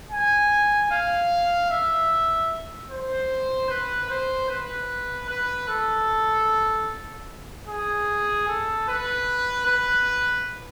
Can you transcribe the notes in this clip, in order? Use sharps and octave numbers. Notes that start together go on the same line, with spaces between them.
G#5
F5
E5
C5
B4
C5
B4
B4
A4
G#4
A4
B4
B4